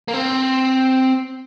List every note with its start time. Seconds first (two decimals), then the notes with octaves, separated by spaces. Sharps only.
0.08 A#3
0.14 C4